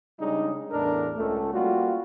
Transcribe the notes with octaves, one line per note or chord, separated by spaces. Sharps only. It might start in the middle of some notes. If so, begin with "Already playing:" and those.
C#3 G3 G#3 D4 D#4
E2 A2 D4 A#4
C#2 A3
G3 A#3 F4 F#4